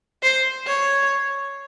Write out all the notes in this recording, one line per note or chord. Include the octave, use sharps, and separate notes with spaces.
C5
C#5